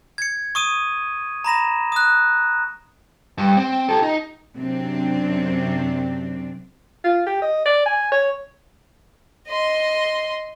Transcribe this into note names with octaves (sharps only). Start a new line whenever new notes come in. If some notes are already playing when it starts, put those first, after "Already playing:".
G#6 C#7
C#6 D#6 D#7
A#5 B5 A#6 E7
D#6 F#6
G2
C4
G4 A4
D#4
F#2 C3 C4 D4
F4
G4
D#5
D5
G#5
C#5
D#5 C6